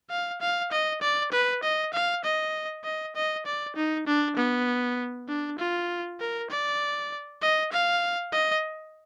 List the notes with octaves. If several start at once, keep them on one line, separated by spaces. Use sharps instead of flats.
F5
F5
D#5
D5
B4
D#5
F5
D#5
D#5
D#5
D5
D#4
D4
B3
D4
F4
A#4
D5
D#5
F5
D#5